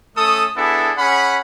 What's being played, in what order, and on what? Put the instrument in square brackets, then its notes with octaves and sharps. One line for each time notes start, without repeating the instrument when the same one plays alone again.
[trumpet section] A3 C#4 A4 D#6
B3 D4 E4 G#4 A4
C#4 G#4 F#5 B5